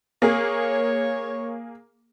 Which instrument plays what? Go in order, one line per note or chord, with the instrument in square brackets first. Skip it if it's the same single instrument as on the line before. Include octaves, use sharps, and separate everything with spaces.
[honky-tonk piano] A#3 G#4 [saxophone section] C#5